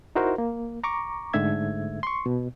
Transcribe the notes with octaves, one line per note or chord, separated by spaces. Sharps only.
D#4 E4 F#4 A#4 C5
A#3
A#5 C#6 D6
G#2 D3 A3 E5 G#6
C6 C#6
B2